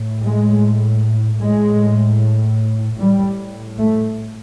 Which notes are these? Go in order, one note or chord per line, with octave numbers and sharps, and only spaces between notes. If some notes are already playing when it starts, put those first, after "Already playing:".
Already playing: A2
G#3
A2 G#3
A2 G3
A3